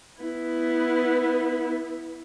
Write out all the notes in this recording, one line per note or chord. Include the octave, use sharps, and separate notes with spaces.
B3 E4